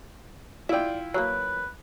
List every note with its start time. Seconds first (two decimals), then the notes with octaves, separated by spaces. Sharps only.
0.69 E4 F4 D5 E5 G5
1.14 F#3 A3 A#3 B4